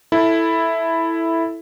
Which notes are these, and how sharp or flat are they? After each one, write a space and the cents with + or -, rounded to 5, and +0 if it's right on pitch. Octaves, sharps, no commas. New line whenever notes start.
E4 +0 A4 +0